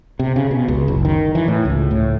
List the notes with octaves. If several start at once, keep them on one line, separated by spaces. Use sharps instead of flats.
C3
C#3
B2
C#2
F#1
D#3
E3
A2
C#2
A2